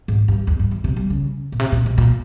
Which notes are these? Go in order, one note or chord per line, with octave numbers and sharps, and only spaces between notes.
G#2
G2
E2
G2
E2
C3
G3
C#3
A#2
C3
A#2
A#2
A#2